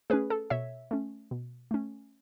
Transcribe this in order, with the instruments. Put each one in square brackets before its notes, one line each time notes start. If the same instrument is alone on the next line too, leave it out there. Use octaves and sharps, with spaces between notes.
[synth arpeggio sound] A3 C#4 G#4 B4
A4
B2 C#5 E5
A3 C#4
B2
A3 C#4